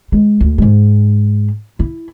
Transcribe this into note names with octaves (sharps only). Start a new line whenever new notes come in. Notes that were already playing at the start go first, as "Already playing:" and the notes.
G#3
D2
G#2 G#3
E4